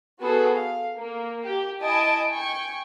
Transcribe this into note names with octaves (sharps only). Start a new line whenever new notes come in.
B3 F#4 G#4 A4 B4
F5
A#3
G4
E4 D#5 G#5 A5 D7
G5 G#5 C#6